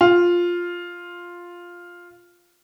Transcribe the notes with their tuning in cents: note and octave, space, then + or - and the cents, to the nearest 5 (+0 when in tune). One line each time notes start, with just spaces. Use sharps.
F4 +5